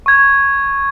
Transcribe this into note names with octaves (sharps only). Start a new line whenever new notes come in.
C#6 G#6